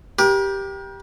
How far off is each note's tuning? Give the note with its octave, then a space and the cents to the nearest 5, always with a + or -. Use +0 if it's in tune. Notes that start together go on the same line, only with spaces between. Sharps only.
G4 +0 A#4 +45